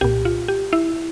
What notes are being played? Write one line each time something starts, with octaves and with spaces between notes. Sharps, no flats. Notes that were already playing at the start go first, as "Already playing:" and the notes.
C2 A#2 G4
F4
G4
E4